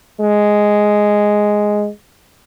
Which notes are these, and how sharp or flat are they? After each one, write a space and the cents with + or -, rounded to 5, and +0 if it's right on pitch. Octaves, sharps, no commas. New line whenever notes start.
G#3 +0